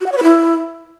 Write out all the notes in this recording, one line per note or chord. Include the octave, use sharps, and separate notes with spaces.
F#4
F#5
C#5
B4
E4